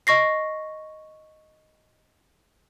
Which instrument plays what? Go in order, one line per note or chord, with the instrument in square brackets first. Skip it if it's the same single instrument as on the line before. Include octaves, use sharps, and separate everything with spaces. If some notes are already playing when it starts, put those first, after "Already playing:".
[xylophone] D#5 C#6 A#6 C7